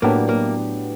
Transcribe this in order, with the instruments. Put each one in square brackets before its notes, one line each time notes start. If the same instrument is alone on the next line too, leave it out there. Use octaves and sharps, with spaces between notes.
[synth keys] A2 F#3 B3 D4 G4 [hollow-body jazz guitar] A#3
[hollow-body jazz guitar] A#3